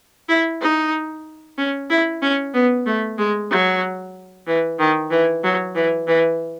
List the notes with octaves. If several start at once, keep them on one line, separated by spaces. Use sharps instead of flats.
E4
D#4
C#4
E4
C#4
B3
A3
G#3
F#3
E3
D#3
E3
F#3
E3
E3